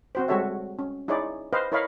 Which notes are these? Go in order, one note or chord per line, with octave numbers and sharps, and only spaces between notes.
C4 F#4 C5
G3 G#3 F#4 A4 C#5 E5
C#4
D#4 E4 G#4 C#5 D5
B4 C5 D#5 F5
E4 A#4 C#5 D#5 F5 B5